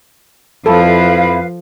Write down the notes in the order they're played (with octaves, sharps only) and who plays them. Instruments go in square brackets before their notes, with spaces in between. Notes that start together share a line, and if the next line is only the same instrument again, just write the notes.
[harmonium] F2 E4 [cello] F3 [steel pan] A4 [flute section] B4 F5